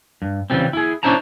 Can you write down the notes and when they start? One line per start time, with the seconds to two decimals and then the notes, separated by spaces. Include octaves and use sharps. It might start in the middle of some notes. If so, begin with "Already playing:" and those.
0.22 G2
0.50 C#3 E3 G3 C4
0.73 E4 G#4
1.03 C#4 D4 E4 C5 A5 A#5